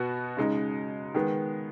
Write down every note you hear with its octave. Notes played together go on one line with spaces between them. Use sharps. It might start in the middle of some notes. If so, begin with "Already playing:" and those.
Already playing: B2 B3 F#4
C#3 G#3 D#4
D#3 G#3 B3